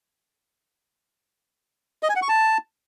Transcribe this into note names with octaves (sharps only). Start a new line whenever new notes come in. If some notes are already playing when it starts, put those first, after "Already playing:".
D#5
G#5
F#5
C#6
A5